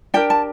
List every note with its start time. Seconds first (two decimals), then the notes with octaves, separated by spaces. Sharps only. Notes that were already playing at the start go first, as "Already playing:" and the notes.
0.14 D4 G4 A#4 G5
0.30 A5